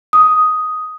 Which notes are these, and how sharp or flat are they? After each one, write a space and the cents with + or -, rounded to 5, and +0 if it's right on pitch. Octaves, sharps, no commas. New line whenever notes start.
D#6 +5